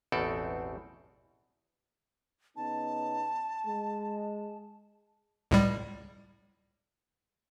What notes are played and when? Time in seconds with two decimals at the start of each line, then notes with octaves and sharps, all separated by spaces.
0.12 A1 E2 B2 C4 A4 D5
2.56 C#3 B3 D#4 A5
3.66 G#3
5.51 C#2 A2 G3